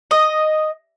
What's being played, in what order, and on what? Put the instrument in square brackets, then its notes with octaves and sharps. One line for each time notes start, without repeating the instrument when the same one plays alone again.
[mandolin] D#5